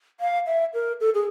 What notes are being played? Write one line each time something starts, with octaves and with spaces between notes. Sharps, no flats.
F5
E5
A#4
A4
G#4